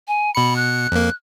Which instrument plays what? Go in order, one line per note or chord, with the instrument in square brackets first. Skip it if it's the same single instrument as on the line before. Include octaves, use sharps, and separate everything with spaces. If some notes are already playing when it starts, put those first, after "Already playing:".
[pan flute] G#5
[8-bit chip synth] B2 C#7 [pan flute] B5
[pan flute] F#6
[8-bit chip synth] F2 A#3